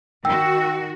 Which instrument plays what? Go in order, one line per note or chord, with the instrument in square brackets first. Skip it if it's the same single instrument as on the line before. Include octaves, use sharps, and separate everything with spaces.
[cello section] D#3 F#4 [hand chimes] G5 E6